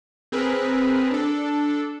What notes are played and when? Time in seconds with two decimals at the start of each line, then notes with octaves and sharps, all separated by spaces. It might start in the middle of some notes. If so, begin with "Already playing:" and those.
0.32 C4 G#4 A#4 B4
1.11 D4 A4